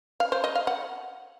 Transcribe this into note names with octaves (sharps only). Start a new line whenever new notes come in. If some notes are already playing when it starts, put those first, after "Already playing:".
F5
C5
D#5
F5
F#5